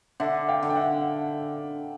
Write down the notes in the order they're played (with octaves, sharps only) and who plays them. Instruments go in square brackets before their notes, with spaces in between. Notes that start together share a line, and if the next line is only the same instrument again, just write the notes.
[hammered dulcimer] D3 [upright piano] E5 F#5
[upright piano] F5 G5
[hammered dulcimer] D3
[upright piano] G5
E5 F#5